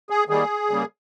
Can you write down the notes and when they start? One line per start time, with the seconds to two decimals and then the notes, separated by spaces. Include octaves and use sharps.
0.10 G#4
0.29 D#3 G3 A#3 G#4
0.69 C#3 G3 A#3